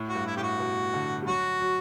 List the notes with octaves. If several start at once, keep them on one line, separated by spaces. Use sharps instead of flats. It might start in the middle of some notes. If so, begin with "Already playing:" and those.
Already playing: A2
F#4
G2
E4
A2 G4
F#4
B2
D3
G3
F#3 F#4
F#3